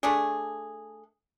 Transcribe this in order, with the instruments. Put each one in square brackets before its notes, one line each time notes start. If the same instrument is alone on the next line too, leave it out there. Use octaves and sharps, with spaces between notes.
[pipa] A3 D4 G#4